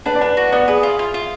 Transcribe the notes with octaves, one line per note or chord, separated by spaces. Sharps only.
D4 B4
D5
D4 B4
F#4
B3 D5
G#4 B4
F4
F4
F4